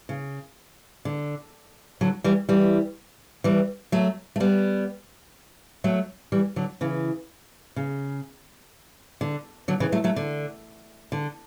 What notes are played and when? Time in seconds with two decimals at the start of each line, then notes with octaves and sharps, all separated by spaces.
0.09 C#3
1.05 D3
2.01 D3 F#3
2.24 E3 G3
2.49 E3 G3
3.44 E3 G3
3.92 F#3 A3
4.36 A3
4.40 G3 B3
5.84 F#3 A3
6.32 E3 G3
6.56 D3 F#3
6.81 C#3 E3
7.76 C#3
9.21 D3
9.68 D3 F#3
9.80 C#3 E3
9.92 F#3 A3
10.04 F#3 A3
10.16 D3
11.12 D3